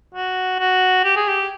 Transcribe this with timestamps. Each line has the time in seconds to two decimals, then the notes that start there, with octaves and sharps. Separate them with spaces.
0.15 F#4
0.60 F#4
1.05 G4
1.16 G#4
1.29 G4